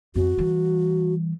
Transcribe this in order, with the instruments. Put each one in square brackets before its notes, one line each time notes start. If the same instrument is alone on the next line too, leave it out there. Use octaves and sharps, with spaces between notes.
[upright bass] F2 [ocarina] F#4
[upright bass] E3 G3